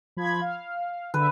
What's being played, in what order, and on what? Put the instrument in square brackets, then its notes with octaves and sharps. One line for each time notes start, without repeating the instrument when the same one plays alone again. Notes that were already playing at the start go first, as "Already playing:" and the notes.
[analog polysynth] F3 B5 G#6
F5
[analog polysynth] D3 E5 [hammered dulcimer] B4